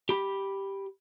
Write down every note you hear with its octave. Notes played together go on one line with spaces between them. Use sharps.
G4 B5